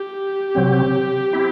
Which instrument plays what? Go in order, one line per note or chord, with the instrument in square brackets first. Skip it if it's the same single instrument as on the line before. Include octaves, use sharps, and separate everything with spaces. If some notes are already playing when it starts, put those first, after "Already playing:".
Already playing: [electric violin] G4
[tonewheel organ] C3 F#3 C4
C4 E4